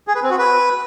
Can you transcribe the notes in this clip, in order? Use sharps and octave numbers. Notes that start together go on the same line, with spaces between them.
G#4
B4
C4
F#4
B4